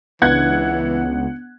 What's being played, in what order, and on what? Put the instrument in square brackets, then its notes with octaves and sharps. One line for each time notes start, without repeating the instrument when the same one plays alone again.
[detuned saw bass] C#2 [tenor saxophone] E3 [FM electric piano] B3 D4 [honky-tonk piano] F#5 F#6 G#6